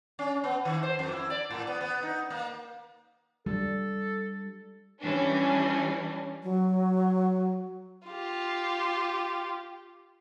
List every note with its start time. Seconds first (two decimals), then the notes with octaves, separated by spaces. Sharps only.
0.19 C#4
0.44 B3
0.65 D#3
0.83 C5
0.99 F2
1.12 E4
1.30 D5
1.51 A2
1.67 B3
1.81 B3
2.03 D#4
2.30 A#3
3.46 G3 A4
5.01 E3 G3 C#4 D4
6.43 F#3
8.07 F4 G4